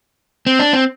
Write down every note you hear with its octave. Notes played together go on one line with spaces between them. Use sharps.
C4
D4
C4